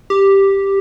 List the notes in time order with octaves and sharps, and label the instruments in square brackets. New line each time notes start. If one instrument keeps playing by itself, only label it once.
[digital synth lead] G4